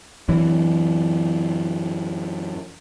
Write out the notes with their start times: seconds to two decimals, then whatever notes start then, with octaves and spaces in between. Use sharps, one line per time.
0.29 F#2 E3